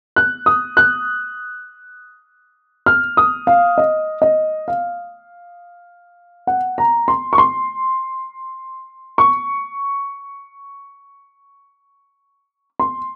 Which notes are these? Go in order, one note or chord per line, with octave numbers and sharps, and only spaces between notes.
F#6
D#6
F#6
F6
D#6
F5
D#5
D#5
F5
F#5
A#5
C6
C#6
C6
C#6
C6